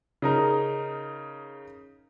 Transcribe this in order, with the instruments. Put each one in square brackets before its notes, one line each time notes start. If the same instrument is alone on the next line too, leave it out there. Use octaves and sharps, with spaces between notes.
[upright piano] C#3 D#4 A#4